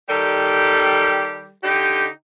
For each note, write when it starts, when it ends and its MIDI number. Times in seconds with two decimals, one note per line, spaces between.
0.09 1.51 51
0.09 1.51 55
0.09 1.51 67
0.09 1.51 69
1.64 2.06 50
1.64 2.06 63
1.64 2.06 67